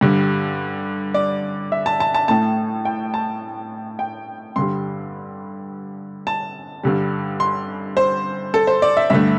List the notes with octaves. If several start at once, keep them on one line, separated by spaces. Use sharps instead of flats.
G2 D3 G3
D5
E5
A5
A5
A5
A2 A3 A5
G5
A5
G5
G2 D3 G3 C6
A5
G2 D3 G3
C6
C5
A4
C5
D5
E5
G2 D3 A3 E5